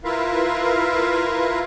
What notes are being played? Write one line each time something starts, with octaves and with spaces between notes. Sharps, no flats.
E4 F4 A#4 B4 E5 F5